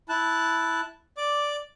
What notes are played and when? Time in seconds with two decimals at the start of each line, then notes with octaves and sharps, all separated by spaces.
0.09 E4 A5 F#6
1.17 D5 D6